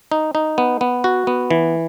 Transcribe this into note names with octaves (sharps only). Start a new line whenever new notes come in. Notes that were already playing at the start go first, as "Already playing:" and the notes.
D#4
D#4
B3
B3
F#4
B3
E3